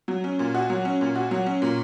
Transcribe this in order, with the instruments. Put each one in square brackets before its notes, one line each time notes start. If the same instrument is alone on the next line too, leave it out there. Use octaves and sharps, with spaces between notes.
[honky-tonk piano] F#3
C#4
A#2
F#4
F#3
C#4
A#2
F#4
F#3
C#4
A#2